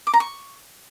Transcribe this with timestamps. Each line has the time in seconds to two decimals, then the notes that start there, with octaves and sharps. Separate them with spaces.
0.07 D6
0.13 A#5
0.20 C#6